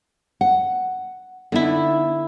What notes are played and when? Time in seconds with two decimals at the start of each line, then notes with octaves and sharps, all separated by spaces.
0.41 F#5
1.52 D3 B3 D#4 E4